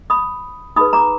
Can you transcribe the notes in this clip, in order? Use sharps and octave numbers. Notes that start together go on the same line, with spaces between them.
B5 D#6
D#4 G#4 B4 B5 D#6
A#5 D6